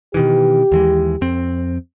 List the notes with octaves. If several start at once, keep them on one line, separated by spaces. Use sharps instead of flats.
B2 D#3 E3 G4
D#2 E3 G#3
F2 C4